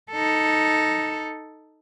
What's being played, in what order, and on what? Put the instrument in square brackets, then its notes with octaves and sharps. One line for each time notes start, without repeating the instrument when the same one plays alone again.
[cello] D#4 A4